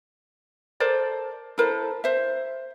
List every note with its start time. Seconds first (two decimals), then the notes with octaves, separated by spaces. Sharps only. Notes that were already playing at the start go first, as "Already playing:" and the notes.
0.80 A4 A#4 C5 D5
1.58 E4 A4 A#4 C5
2.04 C5 E5